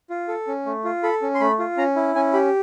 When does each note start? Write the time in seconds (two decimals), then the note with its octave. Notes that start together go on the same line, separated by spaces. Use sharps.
0.10 F4
0.28 A4
0.48 C#4
0.66 A3
0.84 F4
1.03 A4 B5
1.22 C#4
1.35 C6
1.40 A3 B5
1.59 F4
1.77 C#4 A#5
1.96 E4
2.15 C#4 G#5
2.33 G4 B5